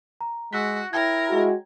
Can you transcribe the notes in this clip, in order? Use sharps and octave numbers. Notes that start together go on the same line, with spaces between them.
A#5
G#3 F#4 E6 F#6 B6
E4 A#4 C#5 G5 G#6
G#3 F#4